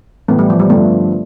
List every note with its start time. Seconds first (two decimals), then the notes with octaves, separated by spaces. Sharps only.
0.28 A2 E3 A3 B3
0.39 G3
0.50 F3
0.59 G3
0.70 G2 D3 F3 A3 B3